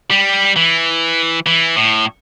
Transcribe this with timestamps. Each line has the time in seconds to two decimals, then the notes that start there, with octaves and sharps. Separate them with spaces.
0.11 G3
0.56 E3
1.46 E3
1.77 A2